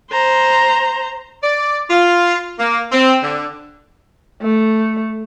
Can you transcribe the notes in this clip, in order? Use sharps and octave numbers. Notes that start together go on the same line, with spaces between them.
C5 A#5
D5
F4
A#3
C4
D3
A3